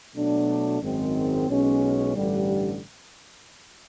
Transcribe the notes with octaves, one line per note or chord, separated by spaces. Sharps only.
B2 F#3 A3 D4
G#1 F#2 D#3 G#3 C4
B1 B2 G#3 C#4
A1 G2 D3 G3